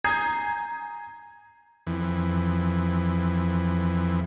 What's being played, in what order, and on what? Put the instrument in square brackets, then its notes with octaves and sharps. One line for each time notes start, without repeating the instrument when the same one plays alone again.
[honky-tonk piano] G#5 A#5 D#6 G6 G#6 C7
[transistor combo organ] F2 E3